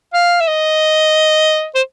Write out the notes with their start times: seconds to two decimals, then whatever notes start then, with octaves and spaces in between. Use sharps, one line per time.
0.14 F5
0.40 E5
0.48 D#5
1.75 C5